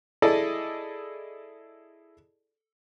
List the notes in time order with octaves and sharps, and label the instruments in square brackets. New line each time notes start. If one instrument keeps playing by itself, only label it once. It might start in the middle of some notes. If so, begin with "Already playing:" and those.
[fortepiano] E4 G#4 A4 D5 D#5